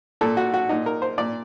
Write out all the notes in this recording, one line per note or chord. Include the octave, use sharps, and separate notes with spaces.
A#2 A4
F#4
F#4
A#2 D#4
A#4
C5
A#2 D5